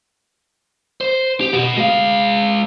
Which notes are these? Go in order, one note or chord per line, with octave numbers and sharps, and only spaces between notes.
C5
G4
B3 F#4
G#3 F5